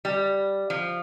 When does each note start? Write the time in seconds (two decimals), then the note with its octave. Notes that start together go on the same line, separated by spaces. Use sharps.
0.05 G3
0.70 F3